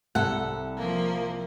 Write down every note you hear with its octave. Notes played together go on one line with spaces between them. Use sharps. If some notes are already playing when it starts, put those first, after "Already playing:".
C2 A4 F#5
F3 A#3